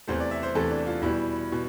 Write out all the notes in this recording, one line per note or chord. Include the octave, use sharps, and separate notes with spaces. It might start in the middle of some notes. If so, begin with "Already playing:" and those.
E2 C3 E3 A3 C5
D5
E5
C5
E2 C3 E3 A3 A4
D4
F4
E2 B2 G3 E4
B2